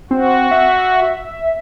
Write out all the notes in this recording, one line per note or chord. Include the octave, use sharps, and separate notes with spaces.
C4 F#4
E5